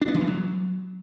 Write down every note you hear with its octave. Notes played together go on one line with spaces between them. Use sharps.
D4
B3
E3
G#3
F#3